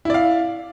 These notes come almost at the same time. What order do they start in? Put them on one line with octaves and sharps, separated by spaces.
E4 D5 F5